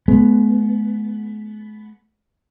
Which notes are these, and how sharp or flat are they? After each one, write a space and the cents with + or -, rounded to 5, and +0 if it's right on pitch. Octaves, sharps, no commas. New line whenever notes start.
G#3 +45 B3 +0